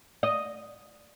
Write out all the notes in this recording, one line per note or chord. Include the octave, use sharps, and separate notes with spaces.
D#5